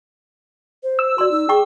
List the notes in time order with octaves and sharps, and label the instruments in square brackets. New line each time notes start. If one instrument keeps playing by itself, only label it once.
[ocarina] C5
[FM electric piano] E6
[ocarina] F#4 [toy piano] D5 C6
[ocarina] D#4
[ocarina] G#4 [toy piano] G5 C#6 D6